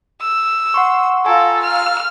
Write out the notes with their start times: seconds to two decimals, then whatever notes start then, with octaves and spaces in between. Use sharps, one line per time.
0.21 E6
0.74 F#5 C6 C#6
1.26 F4 A4 G#5 A#5 E6
1.63 F6